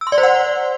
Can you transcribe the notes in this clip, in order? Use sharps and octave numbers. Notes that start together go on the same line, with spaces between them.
E6
C6
D5
C5
F#5